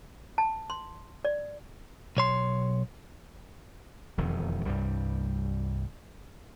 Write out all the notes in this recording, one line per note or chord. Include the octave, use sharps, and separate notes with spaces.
A5
C6
D5
B1 C#5 C6
E1 F2 D#3
C2 G2 G3